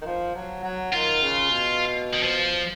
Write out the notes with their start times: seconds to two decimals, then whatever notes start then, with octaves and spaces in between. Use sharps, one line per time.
0.02 D#3
0.06 F3
0.35 F#3
0.63 F#3
0.92 D#3 F4
1.21 C#3
1.50 B2
2.13 D#3
2.23 F3